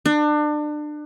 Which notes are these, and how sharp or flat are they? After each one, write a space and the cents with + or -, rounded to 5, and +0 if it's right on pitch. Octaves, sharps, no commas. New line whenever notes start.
D4 +30